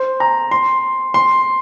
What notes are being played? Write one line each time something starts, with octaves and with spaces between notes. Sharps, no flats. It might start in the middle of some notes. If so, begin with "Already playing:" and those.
Already playing: C5
A#5
C6
C6